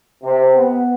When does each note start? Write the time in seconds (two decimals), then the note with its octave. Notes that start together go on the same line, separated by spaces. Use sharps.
0.23 C3
0.56 B3